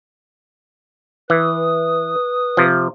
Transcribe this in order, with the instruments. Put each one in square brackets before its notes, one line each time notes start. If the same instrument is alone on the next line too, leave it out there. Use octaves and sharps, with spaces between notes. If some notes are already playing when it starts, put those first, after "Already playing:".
[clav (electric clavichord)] E3 [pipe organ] B4 D#6
[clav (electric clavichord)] C3 F3